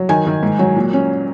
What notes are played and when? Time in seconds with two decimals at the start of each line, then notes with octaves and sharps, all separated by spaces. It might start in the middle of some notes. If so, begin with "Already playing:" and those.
Already playing: F#3
0.09 D#3 G#5
0.27 D#3
0.43 G#2
0.59 F#3
0.76 A#2
0.93 C#4